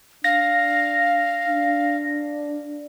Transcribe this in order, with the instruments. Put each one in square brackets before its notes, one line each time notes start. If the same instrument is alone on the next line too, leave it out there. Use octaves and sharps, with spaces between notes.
[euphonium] D4 [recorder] F5 [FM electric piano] A#6
[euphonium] D4